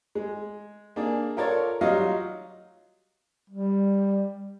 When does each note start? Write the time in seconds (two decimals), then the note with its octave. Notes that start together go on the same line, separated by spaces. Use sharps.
0.15 G#3
0.96 A#3 D4 G#4
1.37 F4 A4 A#4 C#5 D5
1.81 F#3 G3 D#4 F4 D#5 F5
3.50 G3